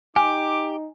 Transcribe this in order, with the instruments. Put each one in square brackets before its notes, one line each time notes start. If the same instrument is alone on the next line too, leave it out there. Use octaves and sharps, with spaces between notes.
[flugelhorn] D#4 [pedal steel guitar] G4 [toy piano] G#5 [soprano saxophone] D6